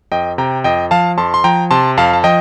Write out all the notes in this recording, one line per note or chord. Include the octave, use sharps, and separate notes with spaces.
F2 D#5 G5
C3 G5 A#5
F2 D#5 G5
F3 F5 A5
F2 A5 C6
C6
F3 G5 A#5
C3 A5 C6
F2 F5 A5
A5
F3 D#5 G5